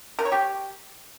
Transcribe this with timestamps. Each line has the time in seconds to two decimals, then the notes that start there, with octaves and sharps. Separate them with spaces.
0.19 A#4
0.25 C#5
0.32 G4